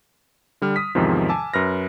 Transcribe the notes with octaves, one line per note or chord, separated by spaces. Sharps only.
D3 G3 F6
D#6 B6
E2 G#2 C3 D#3 F3
G#5 A5 D6 E6
F#2 B4 F6 A#6